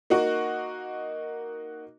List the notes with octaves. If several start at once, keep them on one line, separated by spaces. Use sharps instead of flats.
A#3 D#4 F#4